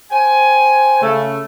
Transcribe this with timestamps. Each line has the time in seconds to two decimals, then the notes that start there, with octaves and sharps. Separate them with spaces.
0.11 C5 G5 G#5
1.01 C#3 A3